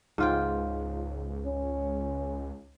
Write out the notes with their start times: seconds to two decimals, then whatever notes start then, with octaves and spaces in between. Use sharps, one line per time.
0.18 C#2 G#2 F4 G5
1.46 C#4